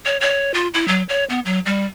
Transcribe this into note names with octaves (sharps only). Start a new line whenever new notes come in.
C#5
C#5
F4
E4
F#3
C#5
B3
F#3
G3